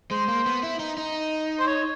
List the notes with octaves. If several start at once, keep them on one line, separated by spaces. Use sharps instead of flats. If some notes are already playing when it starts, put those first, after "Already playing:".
G#3 C5
A#3
B3
E4
D#4
D#4
C5
C#5